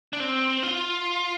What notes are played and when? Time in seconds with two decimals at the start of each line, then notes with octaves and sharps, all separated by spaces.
0.13 D4
0.20 C4
0.63 F4